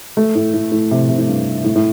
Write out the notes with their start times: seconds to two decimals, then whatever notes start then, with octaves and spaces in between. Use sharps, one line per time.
0.17 A3
0.35 A2
0.54 A2
0.72 A2
0.91 C3
1.09 C3
1.18 A2
1.28 G2
1.64 A2
1.76 A2